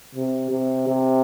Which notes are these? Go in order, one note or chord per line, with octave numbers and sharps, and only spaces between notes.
C3
C3
C3